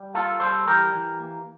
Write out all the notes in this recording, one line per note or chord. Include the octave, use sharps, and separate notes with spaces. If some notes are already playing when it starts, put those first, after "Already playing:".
Already playing: G3
A#3 F4 A4
G3 A4 C5
E3 G4 A#4
E3
A#3